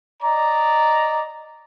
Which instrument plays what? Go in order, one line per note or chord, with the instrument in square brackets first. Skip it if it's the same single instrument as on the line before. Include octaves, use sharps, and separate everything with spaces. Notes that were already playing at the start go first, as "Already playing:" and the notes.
[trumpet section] D5 D#5 A#5